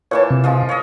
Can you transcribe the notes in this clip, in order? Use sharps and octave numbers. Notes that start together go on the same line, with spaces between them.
A#2 E3 C#5 A5
C3
F3 G#3 F4
C#5 D#5